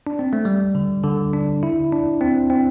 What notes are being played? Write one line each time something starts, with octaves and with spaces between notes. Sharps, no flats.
D4
C4
A3
G3
D3
D3
D4
E4
D4
C4
C4